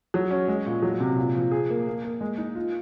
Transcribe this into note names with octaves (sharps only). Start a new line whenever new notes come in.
F#3
C#4
G#3
A#2
F#3
C3
A#2
F3
G#4
A#3
A#3
A#3
G#3
D#4
F4